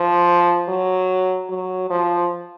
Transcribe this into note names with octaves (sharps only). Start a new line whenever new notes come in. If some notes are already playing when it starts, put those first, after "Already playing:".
Already playing: F3
F#3
F#3
F3